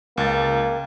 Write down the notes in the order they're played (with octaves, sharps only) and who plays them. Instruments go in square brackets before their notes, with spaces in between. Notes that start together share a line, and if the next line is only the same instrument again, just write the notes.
[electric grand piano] C#2 A6 [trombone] A#3